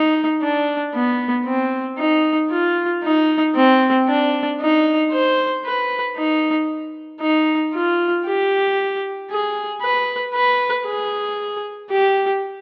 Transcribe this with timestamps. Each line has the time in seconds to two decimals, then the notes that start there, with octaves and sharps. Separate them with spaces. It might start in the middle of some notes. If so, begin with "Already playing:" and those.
Already playing: D#4
0.42 D4
0.94 B3
1.46 C4
1.98 D#4
2.51 F4
3.03 D#4
3.56 C4
4.08 D4
4.60 D#4
5.12 C5
5.64 B4
6.16 D#4
7.20 D#4
7.73 F4
8.25 G4
9.31 G#4
9.82 B4
10.35 B4
10.86 G#4
11.91 G4